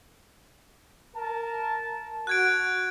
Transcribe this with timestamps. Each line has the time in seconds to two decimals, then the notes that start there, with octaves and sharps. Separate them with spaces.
1.16 A#4 A5
2.27 F#4 F#6 G#6 D7